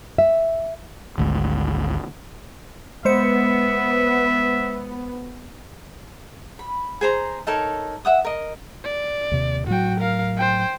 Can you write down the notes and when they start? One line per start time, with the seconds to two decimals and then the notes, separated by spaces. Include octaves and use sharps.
0.18 E5
1.18 G#1 D2 G#2
3.05 G#3 B3 C5 E5 C#7
6.59 B5
7.01 G#4 C5 A#5
7.47 D#4 A4 A#4 C#5
8.05 E5 F#5 D#6
8.25 A#4 D#5
8.84 D5
9.31 D#2 C3
9.67 A2 F#3 F#4 G5
10.00 A#4 F5
10.37 C5 G5